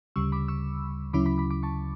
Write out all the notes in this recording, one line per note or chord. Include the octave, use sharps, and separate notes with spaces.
D2 C#3 G3 C#6 E6
B5 D6
C#6 E6
D2 C#3 F#3 C#4 E4 B5 D6
B5 D6
B5 D6
B5 D6
A5 C#6